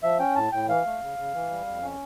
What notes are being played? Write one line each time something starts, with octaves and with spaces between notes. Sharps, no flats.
F3 E5
C#4 G5
A2 A5
A2 G5
E3 F5
A3
C#3
C#3
E3
G3
F2
C#4